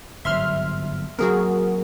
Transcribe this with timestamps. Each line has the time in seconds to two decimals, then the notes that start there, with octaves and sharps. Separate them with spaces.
0.25 G1 G#2 F#3 E5 C6 F6
1.19 F#3 A#3 C4 F#4 G#4 A#4